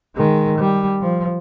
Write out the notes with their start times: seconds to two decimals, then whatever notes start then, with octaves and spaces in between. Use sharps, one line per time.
0.16 D#3 G#3
0.58 G3
1.01 F3